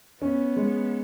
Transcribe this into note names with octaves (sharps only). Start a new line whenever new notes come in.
B3 C#4
G#3